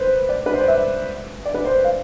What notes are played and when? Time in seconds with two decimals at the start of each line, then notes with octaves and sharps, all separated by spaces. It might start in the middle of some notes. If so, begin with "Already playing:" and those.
Already playing: B4 C5
0.29 D5
0.46 B4
0.54 C5
0.60 D5
0.68 E5
1.45 D5
1.54 B4
1.65 C5
1.84 F5